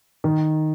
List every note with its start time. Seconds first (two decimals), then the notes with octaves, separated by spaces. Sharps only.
0.24 D#3